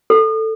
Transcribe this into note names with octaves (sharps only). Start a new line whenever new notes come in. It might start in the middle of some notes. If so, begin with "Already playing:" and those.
A4